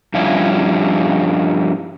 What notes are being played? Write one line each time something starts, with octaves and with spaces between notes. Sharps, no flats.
G2 F3 C#4 E4